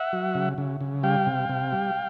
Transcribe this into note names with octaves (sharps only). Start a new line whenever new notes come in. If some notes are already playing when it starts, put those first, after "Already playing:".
Already playing: E5 F#5
F#3
C#3
C#3
C#3
G3 F5 G5
C3
C3
G3